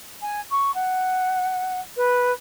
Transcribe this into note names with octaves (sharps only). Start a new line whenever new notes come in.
G#5
C#6
F#5
B4